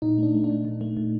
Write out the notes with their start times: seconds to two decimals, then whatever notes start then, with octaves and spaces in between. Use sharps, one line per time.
0.02 A#2 D#4
0.18 A3 D4
0.34 A3
0.44 D4
0.50 A#2
0.65 A#2
0.81 A3
0.97 A#2